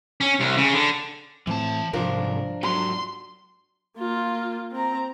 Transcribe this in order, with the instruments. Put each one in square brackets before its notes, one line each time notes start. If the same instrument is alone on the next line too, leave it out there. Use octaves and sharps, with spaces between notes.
[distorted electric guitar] C#4
C2
C#3
D3
[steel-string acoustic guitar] A2 C4 [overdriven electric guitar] E3 A5
[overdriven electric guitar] C2 G#2 [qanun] F3 [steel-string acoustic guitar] D4 A#4
[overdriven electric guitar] G#2 F#3 [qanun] F#5 [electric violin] C6
[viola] A#3 F4
C4 A#5